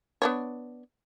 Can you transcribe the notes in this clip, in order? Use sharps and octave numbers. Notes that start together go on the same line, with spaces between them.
B3 D4 C#5